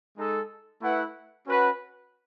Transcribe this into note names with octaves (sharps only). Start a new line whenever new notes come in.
G#3 D#4 A4
A3 E4 B4 F#5
C#4 F#4 B4 F#5